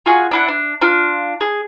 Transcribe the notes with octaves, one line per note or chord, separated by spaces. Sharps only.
F4 F#4 G#4
D4 E4 F#5
D4
D4 F4
G#4